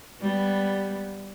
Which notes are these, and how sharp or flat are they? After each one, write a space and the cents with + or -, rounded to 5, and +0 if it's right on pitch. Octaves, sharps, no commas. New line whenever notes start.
G3 +0 B3 +0